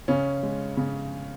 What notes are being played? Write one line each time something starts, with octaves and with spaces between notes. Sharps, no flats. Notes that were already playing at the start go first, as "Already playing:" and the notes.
C#3 C#4
G#3
C#3